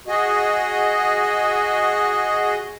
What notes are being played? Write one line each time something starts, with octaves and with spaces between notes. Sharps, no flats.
F#4 G#4 D#5